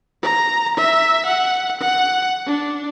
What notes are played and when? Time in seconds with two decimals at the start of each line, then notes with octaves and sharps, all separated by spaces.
0.23 A#5
0.77 E5
1.26 F#5
1.80 F#5
2.47 D4